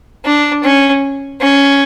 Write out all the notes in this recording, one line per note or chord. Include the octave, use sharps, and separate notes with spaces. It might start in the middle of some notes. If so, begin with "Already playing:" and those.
D4
C#4
C#4